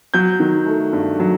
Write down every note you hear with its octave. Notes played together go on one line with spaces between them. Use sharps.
F#3 G6
D#3
A3
G2
F#3